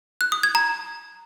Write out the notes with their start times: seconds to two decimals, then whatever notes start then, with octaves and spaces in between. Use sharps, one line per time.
0.21 F#6
0.32 D#6
0.43 G#6
0.55 A#5